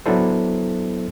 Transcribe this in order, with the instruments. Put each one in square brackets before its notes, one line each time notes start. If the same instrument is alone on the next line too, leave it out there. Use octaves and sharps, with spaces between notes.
[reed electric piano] F#3 B3 D4 E4 A4 C5